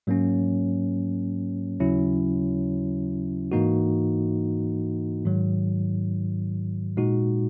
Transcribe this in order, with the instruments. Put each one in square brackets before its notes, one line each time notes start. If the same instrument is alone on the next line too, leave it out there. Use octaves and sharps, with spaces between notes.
[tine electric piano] G#2 F#3 A#3 C#4
D#2 C#3 F#3 C#4 E4
G#2 E3 A#3 D#4 F#4
G#2 D#3 F#3
A#2 G#3 D#4 F#4